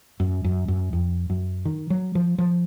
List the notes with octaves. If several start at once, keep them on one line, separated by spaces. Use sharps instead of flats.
F#2
F#2
F#2
F2
F#2
D#3
F#3
F3
F3